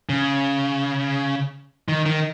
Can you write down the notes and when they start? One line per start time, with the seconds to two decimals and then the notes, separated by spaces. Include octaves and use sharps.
0.09 C#3
1.88 D#3
2.06 D#3